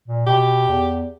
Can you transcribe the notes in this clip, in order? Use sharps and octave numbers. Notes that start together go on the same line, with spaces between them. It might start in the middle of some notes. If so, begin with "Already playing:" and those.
A#2
B2 G4
E2